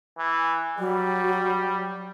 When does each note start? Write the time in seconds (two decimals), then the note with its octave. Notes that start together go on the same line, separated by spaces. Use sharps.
0.19 E3
0.78 F#3 G3